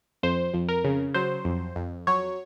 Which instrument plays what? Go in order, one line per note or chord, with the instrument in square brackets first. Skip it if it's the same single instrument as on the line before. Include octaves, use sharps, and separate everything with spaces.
[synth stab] F2 C5
F2
A#4
C#3
F#3 C5
F2
F2
F#3 C#5